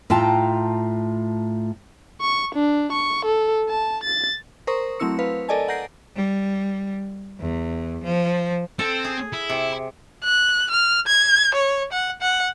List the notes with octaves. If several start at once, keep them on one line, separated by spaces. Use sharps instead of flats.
A2 F4 G5 A5 A#5
C#6
D4
C#6
A4
A5
A6
A#4 C5 A#5 C#6 D#6
F#3 A3 C4 E4 E6 C#7
B4 F5
A4 A#4 D5 D#5 G#5 A5
F#5 A#5 G6 A#6 C7 D7
G3
E2
F3
C4 A4
G#4
E4
C3
F#6
F6
G#6
C#5
F#5
F#5